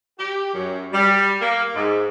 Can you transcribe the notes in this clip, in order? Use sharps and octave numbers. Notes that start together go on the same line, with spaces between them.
G4
F#2
G3
A#3
G#2